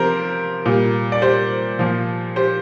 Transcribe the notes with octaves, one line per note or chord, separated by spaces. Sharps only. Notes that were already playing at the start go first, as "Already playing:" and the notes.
Already playing: C3 F3 G4 A#4 C5
A#2 G3
D5
G4 C5
A#2 F3
G4 C5